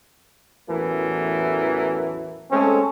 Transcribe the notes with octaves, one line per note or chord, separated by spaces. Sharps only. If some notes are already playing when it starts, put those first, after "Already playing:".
A1 E2 E3 F#3 A3 A#4
G#3 A3 C4 C#4 G#4 A4